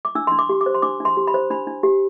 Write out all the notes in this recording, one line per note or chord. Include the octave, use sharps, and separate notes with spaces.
D6
D4 E6
D4 C6
D6
G4
D6
C5
C6
D4 D6
D4
C6
G4
B5
C5
D4 B5
D4
G4